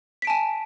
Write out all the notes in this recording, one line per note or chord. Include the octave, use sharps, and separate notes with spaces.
G#5 A5 B6 D7